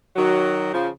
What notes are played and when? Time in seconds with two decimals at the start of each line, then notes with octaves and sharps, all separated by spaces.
0.16 D#3 F#3
0.73 C#3 F3